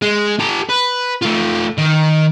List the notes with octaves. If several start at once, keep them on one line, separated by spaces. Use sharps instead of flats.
G#3
G4 A4
B4
A3 F4
D#3